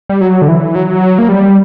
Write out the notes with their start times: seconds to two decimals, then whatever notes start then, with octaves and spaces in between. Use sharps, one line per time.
0.10 G3
0.21 F#3
0.42 D3
0.48 E3
0.75 F#3
1.19 A#3
1.29 G3